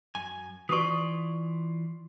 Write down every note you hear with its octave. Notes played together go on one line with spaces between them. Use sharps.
F#2 G#5
E3 F4 D5 C#6 D#6